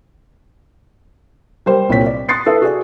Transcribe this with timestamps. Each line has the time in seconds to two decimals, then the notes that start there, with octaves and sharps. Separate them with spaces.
1.66 G3 A#4 C5
1.90 C2 A#2 C#5 G5 B6
2.06 D5
2.29 C6 D#6 F#6 A6 C7 C#7
2.46 E4 A4 B4 E5
2.62 F#4 G#4 D5